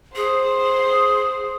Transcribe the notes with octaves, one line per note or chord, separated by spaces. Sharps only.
G#4 C5